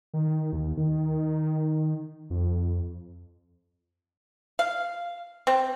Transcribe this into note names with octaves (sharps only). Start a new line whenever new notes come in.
D#3
D#2
D#3
F2
F5
C4